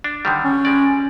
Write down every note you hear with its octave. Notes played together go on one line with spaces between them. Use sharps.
D4
D3 D#3 G3
C#4
G3 G#3 D5